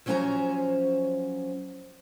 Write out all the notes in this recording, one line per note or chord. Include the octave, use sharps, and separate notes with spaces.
F3 F#3 C#4 C5 G#5 A#5